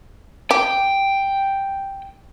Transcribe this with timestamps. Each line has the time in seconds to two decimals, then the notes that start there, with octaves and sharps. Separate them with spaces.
0.51 G4 G5